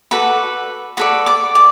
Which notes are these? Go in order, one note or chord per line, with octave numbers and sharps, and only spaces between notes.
F#4 A4 B4 D5 B5
F#4 A4 B4 D5 B5
D5 D6
D5 D6